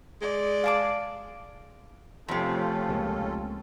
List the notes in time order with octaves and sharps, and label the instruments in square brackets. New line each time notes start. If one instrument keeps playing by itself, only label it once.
[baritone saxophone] G#3 [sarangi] D5
[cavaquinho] G#4 A5 D6 [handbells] F5 D7
[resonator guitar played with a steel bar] F2 C3 [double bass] F3 A3 [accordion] C#4 F4 A4
[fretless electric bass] C#2 G#3 A#3